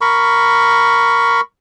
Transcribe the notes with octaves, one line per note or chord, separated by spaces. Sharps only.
A#4 B5 C#6